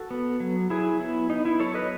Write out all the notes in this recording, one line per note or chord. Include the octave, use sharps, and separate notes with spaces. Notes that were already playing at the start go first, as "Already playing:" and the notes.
Already playing: F#4 A4
B3
F#3
F#3 E4 G#4
B3 E4
B3 D#4
E4
F#3 A4 C#5
B4 D#5